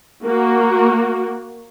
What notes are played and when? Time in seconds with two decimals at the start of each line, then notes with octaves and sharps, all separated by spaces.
0.25 A#3 F#4